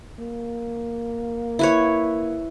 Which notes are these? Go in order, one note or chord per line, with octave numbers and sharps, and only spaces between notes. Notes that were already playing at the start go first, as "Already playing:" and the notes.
A#3
E4 B4 C#5